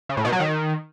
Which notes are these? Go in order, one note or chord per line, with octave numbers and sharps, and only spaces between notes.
C#3
A2
B2
F#3
D#3